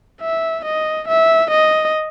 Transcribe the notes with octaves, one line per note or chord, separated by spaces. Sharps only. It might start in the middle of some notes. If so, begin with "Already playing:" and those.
E5
D#5
E5
D#5